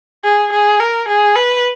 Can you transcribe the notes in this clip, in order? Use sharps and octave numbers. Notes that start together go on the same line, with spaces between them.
G#4
G#4
A#4
G#4
B4